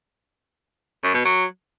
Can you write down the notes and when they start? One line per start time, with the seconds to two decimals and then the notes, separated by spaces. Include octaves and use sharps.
1.04 F#2
1.14 B2
1.25 F#3